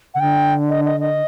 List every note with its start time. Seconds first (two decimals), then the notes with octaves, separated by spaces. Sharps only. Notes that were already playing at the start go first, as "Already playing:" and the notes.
0.14 C#3 F#5
0.20 D3 G5
0.69 D#5
0.85 D#5
1.00 D#5